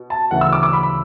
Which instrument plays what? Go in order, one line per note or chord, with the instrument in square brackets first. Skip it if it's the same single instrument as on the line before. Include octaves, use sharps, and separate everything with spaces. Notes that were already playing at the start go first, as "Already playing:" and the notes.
Already playing: [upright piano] B2
A5
D2 C#3 E3 F#5
E6
D6
D6
B5
B5